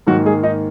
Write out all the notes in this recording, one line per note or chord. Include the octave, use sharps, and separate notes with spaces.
G#2 D#3 F#3 A#3 F#4
G#3 G#4
D#4 D#5